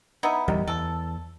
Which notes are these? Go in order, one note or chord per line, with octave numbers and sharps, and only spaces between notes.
B3 D#4 E4
D1 E2 D#3 G3
E2 A4